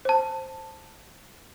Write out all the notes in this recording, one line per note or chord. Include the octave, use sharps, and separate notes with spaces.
C5 A5